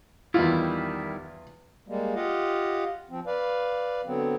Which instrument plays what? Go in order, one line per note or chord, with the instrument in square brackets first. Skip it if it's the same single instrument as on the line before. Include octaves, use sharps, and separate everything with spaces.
[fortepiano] E2 F4 [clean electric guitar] D#3 G3 E4
[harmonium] G3 G#3 A#3
F4 G4 D#5 F5 F#5
F3 C4
B4 D5 F5
D3 F#3 B3 C4